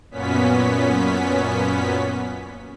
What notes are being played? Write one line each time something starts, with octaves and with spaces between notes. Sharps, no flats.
F#2 A#2 B3 C#4 B6